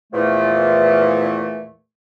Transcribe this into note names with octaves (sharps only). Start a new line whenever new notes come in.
E2 A#2 E3 F3 A3